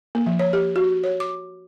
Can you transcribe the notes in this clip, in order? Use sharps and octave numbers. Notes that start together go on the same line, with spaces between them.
A#3
F3
C#5
G4
F#4
C#5
D6